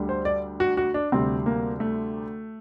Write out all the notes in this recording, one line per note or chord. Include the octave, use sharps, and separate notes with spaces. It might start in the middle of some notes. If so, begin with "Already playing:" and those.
Already playing: D2 D3 G3
C5
D5
F#4
F#4
D4
D2 C3 G3 C4
A#3
A3